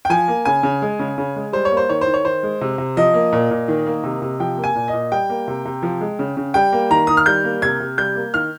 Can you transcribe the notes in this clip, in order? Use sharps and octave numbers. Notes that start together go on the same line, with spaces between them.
G5
F3 G#5
A#3
C#3 G#5
C#3
G#3
C#3
C#3
G#3
G3 C5
C#5
A#3
C5
D#3 C#5
C5
D#3
C#5
D#3 C5
G#3
C3
C3
F3 D#5
A#3
A#2
A#2
D#3
A#3
C3
C3
F3 G5
A#3
G#5
A#2
D#5
A#2
G3 G5
A#3
C3
C3
F3
G#3
C#3
C#3
G3 G5
A#3
D#3 A#5
D#3 D#6
F6
G3 G6
A#3
C3 G#6
C3
G3 G6
A#3
D#3 F6